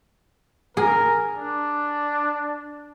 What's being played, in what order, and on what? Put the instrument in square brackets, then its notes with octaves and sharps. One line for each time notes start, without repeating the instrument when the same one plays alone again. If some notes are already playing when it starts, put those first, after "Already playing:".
[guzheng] G#4 [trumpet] A#4
[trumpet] D4